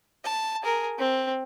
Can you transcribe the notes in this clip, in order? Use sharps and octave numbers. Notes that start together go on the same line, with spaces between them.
A5
G#4 A#4
C4